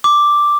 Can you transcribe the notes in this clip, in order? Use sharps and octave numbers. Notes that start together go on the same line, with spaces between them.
D6